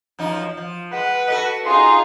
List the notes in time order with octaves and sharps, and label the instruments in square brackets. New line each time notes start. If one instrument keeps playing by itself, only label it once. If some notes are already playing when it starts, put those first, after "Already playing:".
[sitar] F#2 F3 D#4
F3
[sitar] G#3 [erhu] B4 [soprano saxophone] F#5
[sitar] F#4 A4 D#5
[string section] D#4 F4 [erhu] G#4 [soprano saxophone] C6